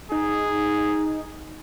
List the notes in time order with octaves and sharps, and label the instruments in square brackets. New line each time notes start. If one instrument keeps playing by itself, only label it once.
[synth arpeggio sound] D#4 [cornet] G#4